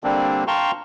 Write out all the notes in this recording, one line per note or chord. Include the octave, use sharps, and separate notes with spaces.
D3 G3 A#3 C4 D4
F5 G5 A5 A#5 C6 C#6